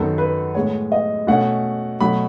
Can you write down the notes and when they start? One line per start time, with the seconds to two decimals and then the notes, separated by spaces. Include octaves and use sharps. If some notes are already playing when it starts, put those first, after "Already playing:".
Already playing: F#2 D#3 F#3 B3 A4
0.18 B4
0.54 A2 G#3 B3 C#5
0.92 D#5
1.27 B2 A3 C#4 F#5
2.01 B2 F#3 A3 B5